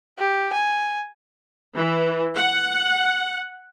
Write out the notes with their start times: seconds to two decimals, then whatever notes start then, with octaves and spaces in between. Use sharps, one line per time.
0.19 G4
0.53 G#5
1.76 E3
2.37 F#5